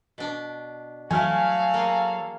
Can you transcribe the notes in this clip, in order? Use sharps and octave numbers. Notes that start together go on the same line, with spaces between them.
B2 D4
F#3 A3 E4 F#4 A4 F5 G#5 F6
A#3 G#4